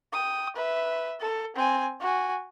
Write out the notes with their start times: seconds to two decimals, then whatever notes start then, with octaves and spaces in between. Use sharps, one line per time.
0.13 G5 D#6
0.56 B4 E5
1.21 A4
1.56 C4 G#5
2.00 F#4 G#5